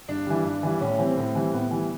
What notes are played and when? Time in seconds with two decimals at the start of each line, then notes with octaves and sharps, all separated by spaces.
0.08 G2 D4
0.27 E3 G3
0.44 G2
0.63 E3 G3
0.81 A2 C#4
0.99 E3 G3 C4
1.17 A2
1.35 E3 G3
1.53 A2 B3
1.71 E3 G3